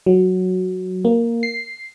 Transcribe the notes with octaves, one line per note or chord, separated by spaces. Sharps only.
F#3
A#3
C7